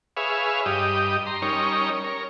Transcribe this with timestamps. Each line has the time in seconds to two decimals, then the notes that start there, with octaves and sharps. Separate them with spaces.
0.17 G#4 B4 C#5 E5 F5
0.66 G2 G4 D#5
1.27 A#5 C6
1.42 G3 C#4 D#4 A#4 C#5
2.04 A#4 C#5